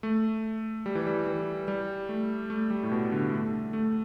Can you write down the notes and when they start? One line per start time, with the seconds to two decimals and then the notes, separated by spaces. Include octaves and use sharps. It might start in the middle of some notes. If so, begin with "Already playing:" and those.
0.03 A3
0.86 G3
0.95 E3
1.07 G3
1.27 E3
1.68 G3
2.09 A3
2.50 A3
2.70 G3
2.83 A2
2.91 B2
3.12 D3
3.32 A3
3.73 A3